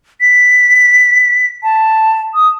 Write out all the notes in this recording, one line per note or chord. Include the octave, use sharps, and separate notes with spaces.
B6
A5
D#6